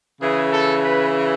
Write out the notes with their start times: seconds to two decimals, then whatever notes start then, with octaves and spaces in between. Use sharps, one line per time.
0.20 C#3 E3 G#4
0.52 A4
0.84 B4